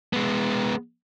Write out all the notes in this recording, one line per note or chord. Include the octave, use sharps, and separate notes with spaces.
G#3 B3